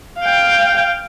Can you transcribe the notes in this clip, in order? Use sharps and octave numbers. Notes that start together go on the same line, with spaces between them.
F5 G5